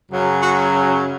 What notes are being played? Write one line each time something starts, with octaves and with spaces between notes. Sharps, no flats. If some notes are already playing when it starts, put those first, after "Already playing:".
F#2 C#3 F#3
F#4